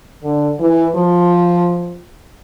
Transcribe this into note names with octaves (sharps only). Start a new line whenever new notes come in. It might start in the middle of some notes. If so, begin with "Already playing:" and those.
D3
E3
F3